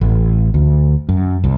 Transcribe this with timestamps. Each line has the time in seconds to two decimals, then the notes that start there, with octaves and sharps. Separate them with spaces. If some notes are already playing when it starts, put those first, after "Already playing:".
0.01 A1
0.54 D2
1.09 F#2
1.44 C2